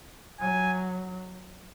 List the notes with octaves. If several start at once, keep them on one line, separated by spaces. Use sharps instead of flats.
F#3 G#5